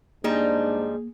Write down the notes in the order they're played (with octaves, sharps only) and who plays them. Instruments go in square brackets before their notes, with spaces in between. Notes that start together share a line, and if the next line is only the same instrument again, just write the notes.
[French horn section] G#2 D4 [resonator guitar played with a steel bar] F3 G3 D#4 [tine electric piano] A#3 [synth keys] G#4